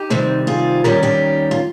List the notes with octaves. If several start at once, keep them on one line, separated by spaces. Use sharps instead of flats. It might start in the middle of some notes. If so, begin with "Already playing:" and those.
Already playing: D#4 G4
C3 D#3 G3 C4
F4 G#4
D#2 D#3 G3 C#4 G4 A#4
G4 A#4
F4